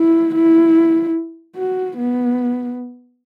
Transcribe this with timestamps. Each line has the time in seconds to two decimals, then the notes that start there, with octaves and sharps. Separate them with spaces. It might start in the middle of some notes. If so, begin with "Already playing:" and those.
Already playing: E4
0.35 E4
1.56 F#4
1.98 B3